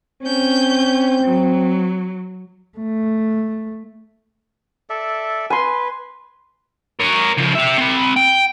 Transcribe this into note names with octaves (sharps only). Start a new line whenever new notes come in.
C4 C#4 G6
F#3
A3
A4 D5 E5
B4 G#5 C6
A#4 C#5
C#3 F3
G4 E5
C4 B5
G5